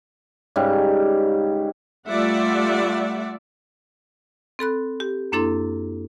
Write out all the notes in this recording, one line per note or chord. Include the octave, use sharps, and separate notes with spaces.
G#2 C#3 G3
G3 A3 F4 D5 E5 F#5
C4 A4 B5 F#6
G4
F#2 A#3 D4 E4 A4 C6